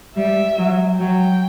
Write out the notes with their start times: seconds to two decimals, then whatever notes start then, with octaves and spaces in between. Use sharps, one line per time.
0.16 G3 E5
0.58 F#3
0.99 F#3 G5